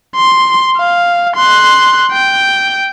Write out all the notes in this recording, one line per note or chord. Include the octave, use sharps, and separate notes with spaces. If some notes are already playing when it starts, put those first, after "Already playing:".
C6
F5
C6 F#6
G5